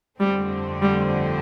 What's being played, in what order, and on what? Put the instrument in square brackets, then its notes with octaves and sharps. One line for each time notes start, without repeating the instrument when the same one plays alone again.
[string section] G1 F2 D3 A3 C4 [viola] G3
[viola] G3